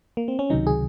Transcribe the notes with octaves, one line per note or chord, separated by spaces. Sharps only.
A#3
C4
C#4
C#2 C3 D#3 F#3 D#4
G#4